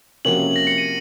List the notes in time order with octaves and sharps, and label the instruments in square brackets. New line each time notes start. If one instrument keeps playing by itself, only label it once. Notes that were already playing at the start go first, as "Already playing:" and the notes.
[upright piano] C3 F3 A#3 C#4 F#4 [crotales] F#7
[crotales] A#6
C#7
D#7